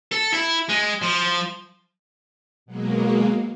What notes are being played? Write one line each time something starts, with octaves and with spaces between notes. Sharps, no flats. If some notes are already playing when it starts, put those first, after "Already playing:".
A4
E4
G#3
F3
B2 F#3 G#3 A#3